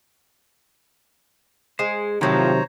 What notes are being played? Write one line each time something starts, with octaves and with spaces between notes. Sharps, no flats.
G#3 C5
A2 C3 D#3 F3 F#3 C5 C#5 A#5